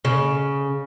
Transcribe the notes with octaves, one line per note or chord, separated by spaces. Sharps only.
C#3